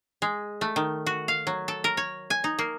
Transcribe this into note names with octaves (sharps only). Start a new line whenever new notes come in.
G#3
A3
D#3
F#4
F5
F#3
A4
A#4
C#5
G#5
D#4
A#3